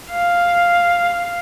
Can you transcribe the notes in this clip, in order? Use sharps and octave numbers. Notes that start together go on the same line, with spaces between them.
F5